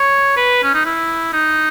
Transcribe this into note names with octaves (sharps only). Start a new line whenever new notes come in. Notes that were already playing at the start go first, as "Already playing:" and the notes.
Already playing: C#5
B4
C#4
D#4
E4
D#4